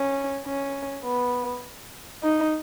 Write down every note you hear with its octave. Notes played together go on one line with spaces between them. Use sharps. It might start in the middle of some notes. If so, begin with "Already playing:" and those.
Already playing: C#4
C#4
B3
D#4